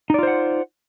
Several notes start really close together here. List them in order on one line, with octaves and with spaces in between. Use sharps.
D#4 D5 F4 C5 F#5